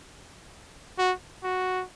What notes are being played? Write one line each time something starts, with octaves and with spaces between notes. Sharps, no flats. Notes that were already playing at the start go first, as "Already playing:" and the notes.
F#4
F#4